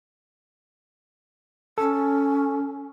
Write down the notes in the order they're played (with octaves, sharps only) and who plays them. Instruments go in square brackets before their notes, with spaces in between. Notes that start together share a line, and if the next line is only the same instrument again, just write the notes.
[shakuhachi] C#4 [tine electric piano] A4